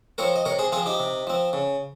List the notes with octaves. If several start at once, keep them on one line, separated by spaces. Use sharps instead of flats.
F3 C4 A#4 C#5
D#5
C3 A#4 C#5
G#4 C5
F3 C4 F4 G#4
D#4 G4
C3
F3 C4
C#3